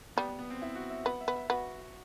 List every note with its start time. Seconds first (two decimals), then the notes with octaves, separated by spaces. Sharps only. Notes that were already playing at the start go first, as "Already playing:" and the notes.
0.17 G3 B3
0.29 B3
0.39 B3
0.50 C4
0.62 E4
0.75 F#4
0.90 E5
1.05 B3 F#5
1.21 E5
1.28 B3
1.36 E5
1.50 B3 F#4